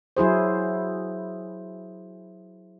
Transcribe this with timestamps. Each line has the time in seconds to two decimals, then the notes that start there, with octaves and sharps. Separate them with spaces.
0.17 F#3 E4 G#4 C5